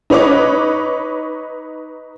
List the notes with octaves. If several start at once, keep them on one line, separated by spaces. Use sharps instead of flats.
D#4 B4 C#5 C#6 D6